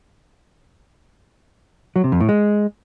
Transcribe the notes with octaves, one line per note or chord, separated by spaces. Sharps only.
F#3
C3
F2
A2
G#3